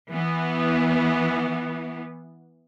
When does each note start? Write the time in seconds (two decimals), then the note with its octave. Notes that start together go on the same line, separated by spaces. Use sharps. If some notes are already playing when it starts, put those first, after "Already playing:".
0.12 E3 B3